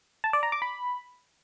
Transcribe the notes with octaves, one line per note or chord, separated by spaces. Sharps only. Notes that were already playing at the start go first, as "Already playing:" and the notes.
A5
D5
A#5
D6
B5